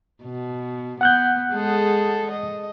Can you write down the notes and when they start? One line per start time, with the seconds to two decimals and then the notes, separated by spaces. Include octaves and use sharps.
0.23 B2
1.01 B3 F#5 F#6 G6
1.52 G#3 G#4 A4
2.31 D#5